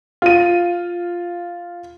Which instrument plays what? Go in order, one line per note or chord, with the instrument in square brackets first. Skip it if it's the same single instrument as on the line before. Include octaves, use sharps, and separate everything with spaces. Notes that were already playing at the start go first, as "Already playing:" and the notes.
[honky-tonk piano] F4 D#7